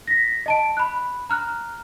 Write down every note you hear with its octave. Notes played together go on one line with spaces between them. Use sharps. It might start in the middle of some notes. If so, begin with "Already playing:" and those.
A#6 B6
D#5 A5 D7
B5 F#6
A#5 F6 F#6